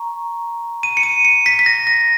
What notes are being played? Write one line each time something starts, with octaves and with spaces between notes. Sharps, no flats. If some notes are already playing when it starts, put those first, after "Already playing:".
Already playing: A#5 C#6
D#7
C#7
D#7
C#7
B6
B6
A#6
A#6